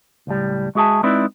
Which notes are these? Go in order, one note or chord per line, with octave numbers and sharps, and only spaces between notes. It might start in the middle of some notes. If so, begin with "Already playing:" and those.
C#2 A2 G3
G#3 F#4 G#4 E5 G#5 A5
G#3 C4 D#4 E4 B4 D5